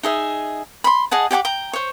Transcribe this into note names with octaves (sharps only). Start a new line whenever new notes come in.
D#4 G#4 E5
B5 C6
G#4 D#5 F#5 A5
G4 F#5 G#5 D6
G5 A#5
C5 C#5